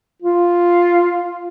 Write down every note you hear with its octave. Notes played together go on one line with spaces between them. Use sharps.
F4